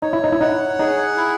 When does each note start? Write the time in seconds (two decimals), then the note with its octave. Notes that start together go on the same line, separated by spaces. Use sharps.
0.02 D#4 C#5
0.13 E4
0.24 D#4
0.32 E4
0.41 D#4 F#5
0.79 D#4 G#4
1.17 E4